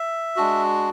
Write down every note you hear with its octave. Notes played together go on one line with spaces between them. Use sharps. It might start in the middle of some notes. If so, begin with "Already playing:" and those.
Already playing: E5
G#3 D4 F#4